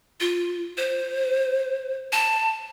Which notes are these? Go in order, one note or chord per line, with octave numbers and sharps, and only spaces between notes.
F4
C5
A5